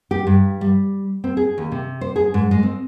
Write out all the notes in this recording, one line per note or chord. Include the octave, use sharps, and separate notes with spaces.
G4
G2
G3
C4
G#4
D#2
C3
C5
G#4
G#2
G#3
C4